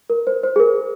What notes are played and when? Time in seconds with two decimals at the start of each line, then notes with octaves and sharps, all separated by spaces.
0.10 A#4
0.27 C5
0.43 C5
0.56 G#4
0.60 A#4